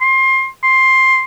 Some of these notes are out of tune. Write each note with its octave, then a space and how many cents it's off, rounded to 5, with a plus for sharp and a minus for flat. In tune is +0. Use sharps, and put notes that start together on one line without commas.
C6 +25
C6 +10